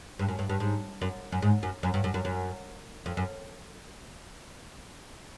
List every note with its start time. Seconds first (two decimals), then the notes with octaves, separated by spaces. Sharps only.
0.19 G2
0.28 F#2
0.39 G2
0.49 G2
0.60 G#2
1.01 F#2
1.32 F#2
1.42 G#2
1.63 F#2
1.83 F#2
1.94 G2
2.04 F#2
2.14 F#2
2.25 F#2
3.06 F2
3.17 F#2